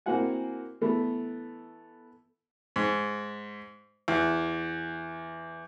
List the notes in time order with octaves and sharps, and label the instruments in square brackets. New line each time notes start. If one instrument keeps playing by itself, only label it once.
[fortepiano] A#3 C4 E4 F#4 F#5 G#5
E3 A3 B3 E4
G#2
E2